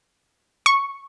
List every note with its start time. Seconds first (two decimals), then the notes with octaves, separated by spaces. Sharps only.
0.66 C#6